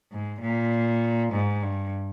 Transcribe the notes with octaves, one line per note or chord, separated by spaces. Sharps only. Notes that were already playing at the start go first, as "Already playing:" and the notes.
G#2
A#2
G#2
G2